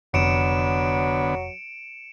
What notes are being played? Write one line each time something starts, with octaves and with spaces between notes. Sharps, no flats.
F1 D3 F#3 B3 C#7 D7 E7